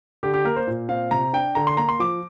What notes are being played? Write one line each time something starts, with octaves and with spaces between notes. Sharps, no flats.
D3 G4
G4
A#3 A#4
C5
A#2
C4 F5
C3 A#5
D4 G5
D3 A#5
C6
A#3 A#5
C6
F3 D6